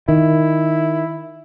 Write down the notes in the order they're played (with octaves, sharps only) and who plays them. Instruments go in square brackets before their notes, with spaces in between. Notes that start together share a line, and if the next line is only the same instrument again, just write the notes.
[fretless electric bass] D#3 [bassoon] E4